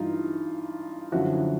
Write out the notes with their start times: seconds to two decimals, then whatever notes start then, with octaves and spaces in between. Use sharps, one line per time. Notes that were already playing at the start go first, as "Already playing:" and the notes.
Already playing: G2 E3 D#4 F4
1.12 F#2 D3 F3 E4 F#4